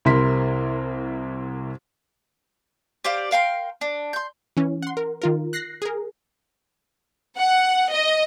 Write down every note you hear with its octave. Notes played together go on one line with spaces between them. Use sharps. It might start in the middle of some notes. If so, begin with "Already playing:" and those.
C2 C3 E4 A#4 C6 B6
G4 C5 D5 F5
A#4 F5 G5 C6
D4
C6 G6
E3 C#4
F#5 C6
A#4
D#3 F4 A#4
F#6 A#6 C7
G#4 A#4
F#5
D#5